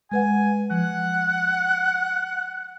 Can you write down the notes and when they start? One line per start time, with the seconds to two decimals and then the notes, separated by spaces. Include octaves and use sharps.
0.11 G#3 B4 F#5 G#5
0.71 F3 F#5